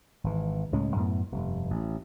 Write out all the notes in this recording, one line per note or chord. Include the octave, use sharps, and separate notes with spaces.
G#1 E3
C#2 A2 G#3 C#4
F#2 A2 B3
F1 G2
A1